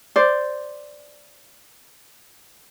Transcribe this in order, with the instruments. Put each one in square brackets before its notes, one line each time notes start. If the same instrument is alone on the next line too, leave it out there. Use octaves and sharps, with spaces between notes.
[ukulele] C5 D5